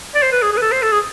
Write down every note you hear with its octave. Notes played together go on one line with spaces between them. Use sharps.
D5
C5
B4
G#4
G#4
B4
A4
C5
A4
G#4